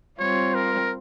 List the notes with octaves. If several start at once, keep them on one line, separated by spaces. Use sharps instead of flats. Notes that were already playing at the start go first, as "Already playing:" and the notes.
G3 C4 F4 C#5
A#4